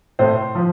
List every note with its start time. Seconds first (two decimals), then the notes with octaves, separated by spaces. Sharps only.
0.19 A2 C5
0.55 F3